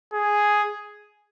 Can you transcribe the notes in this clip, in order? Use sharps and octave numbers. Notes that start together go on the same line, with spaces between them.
G#4